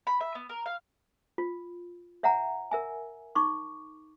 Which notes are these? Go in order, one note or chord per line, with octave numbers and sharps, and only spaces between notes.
B5
E5
B3
A#4
F5
F4
C#5 E5 F#5 G#5 A#5
A#4 E5 G#5
D#4 C#6 D6